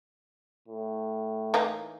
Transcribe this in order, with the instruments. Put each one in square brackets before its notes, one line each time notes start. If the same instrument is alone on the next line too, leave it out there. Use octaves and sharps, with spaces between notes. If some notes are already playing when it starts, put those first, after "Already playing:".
[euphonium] A2
[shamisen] E3 A#3 D#4